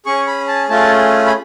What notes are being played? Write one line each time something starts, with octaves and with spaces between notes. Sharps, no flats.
C#4 G#4 C#6
B5
A5
A3 C#4 F4 G#4 A5
B5